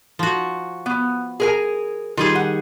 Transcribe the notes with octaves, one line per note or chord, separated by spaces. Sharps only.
F3 F#4
B3
G#4 A#4 G#5
D#3 G3 F4 G#4
F#5